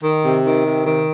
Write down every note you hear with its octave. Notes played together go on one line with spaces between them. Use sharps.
D#3
C3
D#3
C3
D#3